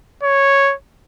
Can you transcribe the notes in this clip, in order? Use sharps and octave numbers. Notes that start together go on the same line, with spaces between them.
C#5